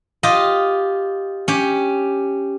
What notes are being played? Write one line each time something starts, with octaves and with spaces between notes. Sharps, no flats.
F4 G4 D#5
C#4 G4